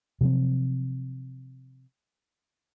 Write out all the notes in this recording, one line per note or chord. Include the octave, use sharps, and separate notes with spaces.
C3 F3 F#3 C4